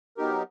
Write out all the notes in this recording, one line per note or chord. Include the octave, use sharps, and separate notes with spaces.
F#3 B3 D#4 G4 A#4